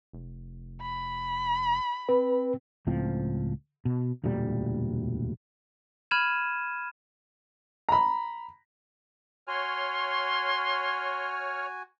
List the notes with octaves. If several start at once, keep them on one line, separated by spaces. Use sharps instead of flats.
F1
B5
C4 B4
C#2 A2 F3 C4
B2
E1 D2 A#2 G3
B5 F6 G#6 D#7 E7
A#5 B5
F#4 C#5 G#5 C6 F6